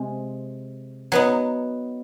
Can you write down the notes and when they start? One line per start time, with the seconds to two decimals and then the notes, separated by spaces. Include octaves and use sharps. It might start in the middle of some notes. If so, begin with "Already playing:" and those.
Already playing: C3 G#3 C4
1.12 F#3 B3 D#4